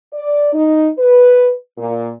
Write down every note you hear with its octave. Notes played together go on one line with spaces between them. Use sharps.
D5
D#4
B4
A#2